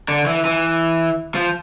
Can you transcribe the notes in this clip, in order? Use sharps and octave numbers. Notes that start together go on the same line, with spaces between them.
D3
E3
E3
F3